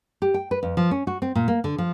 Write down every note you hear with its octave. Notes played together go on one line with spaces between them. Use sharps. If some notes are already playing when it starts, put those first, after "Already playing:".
G4
G5
B4
F2
F3
C#4
F#4
C4
A#2
A#3
D3
F3